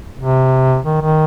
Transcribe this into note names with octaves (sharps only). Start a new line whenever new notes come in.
C3
D#3
D#3